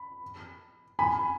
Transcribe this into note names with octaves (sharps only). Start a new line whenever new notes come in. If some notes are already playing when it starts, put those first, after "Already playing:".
Already playing: B5
G#5 B5